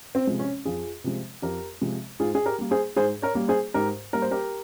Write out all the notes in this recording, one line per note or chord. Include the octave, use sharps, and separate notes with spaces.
C4
C3 F3 G#3
C#4
F2 F4 G#4
C3 F3 G#3
F2 G4 A#4
C3 F3 G#3
G#2 F4 G#4
G#4
G4 A#4
G3 A#3
G#4 C5
G#2 G#4 C5
A#4 C#5
G3 A#3
G#4 C5
G#2 G4 A#4
G3 A#3 A#4
C5
G4 A#4